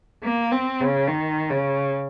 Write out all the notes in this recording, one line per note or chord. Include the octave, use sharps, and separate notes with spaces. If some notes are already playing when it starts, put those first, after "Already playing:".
A#3
C4
C#3
D#3
C#3